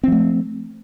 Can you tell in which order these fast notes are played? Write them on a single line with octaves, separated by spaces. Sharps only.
C4 F3 A3